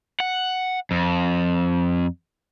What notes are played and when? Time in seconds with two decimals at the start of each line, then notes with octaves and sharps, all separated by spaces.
0.20 F#5
0.91 F2